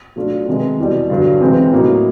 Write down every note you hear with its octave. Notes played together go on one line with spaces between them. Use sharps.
F#3 A3 D4 F4
C3 D#3 G#3 B3
E2 B2 G3
G2 D3 F#3
C3 E3 G#3 C4
A2 F#3 A#3 D#4